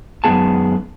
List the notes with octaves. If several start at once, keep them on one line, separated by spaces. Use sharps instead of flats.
F#2 D#3 G#3 B3 G#4 A5